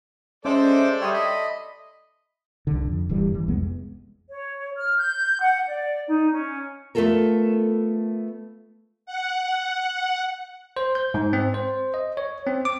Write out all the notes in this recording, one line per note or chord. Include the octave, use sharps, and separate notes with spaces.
G#3 C#4 A4 C5 D5 E5 D6 G6
G3 G4 C#5 E5 C6 D#6
D#5 B5
C2 D3
F2
D1 G2 E3 G3
F#1 E3
C2 F2 G#3 B3
C#5
F6
G6
F#5
D5
D#4
C#4
A3 B3 F4 A4 A#4
F#5
C5
G6
G#2
C4
C5
D#5
C#5
C4
D6